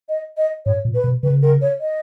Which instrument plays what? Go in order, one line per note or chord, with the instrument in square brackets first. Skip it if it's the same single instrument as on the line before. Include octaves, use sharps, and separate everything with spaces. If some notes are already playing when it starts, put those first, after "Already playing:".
[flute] D#5
D#5
[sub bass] G#2 [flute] C#5
[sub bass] A#2
[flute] B4
[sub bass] B2
[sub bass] C#3 [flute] B4
[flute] A#4
C#5
D#5